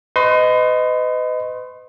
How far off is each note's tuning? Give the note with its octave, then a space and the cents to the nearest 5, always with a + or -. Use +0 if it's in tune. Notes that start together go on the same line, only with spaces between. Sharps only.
B4 +40 D#5 +0 C6 +35